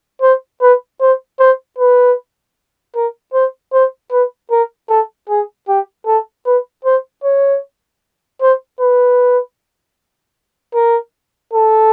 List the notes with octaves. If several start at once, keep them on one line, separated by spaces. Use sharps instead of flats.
C5
B4
C5
C5
B4
A#4
C5
C5
B4
A#4
A4
G#4
G4
A4
B4
C5
C#5
C5
B4
A#4
A4